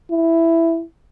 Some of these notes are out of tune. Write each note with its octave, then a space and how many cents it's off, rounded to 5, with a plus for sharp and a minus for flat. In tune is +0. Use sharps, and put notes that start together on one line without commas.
E4 +5